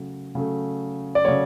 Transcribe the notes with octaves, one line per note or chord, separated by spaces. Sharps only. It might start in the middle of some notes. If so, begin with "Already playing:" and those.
Already playing: C#3 F#3 A3
C#3 F#3 A3
D5
C#3 F#3 A3 C#5